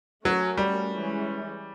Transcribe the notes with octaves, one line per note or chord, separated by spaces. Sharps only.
F#3 A3 C#4 F#4 A#4
G3
E3 G#3 C#4